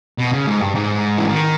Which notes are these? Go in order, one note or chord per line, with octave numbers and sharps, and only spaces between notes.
B2
C#3
G#2
G2
G#2
E3
D#3